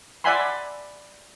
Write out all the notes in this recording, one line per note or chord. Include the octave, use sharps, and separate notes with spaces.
D5 E5 F#5 G#5 B5 C6